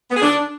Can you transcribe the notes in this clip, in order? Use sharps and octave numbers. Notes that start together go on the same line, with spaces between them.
B3
G#4
D4